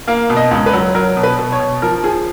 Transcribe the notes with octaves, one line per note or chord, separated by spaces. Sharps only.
A#3 F5
B2
D#5
C#2
B4
F#3
F#3 A#4
B2
B4
B2
C#5
B2
F3 A#4
F3 G#4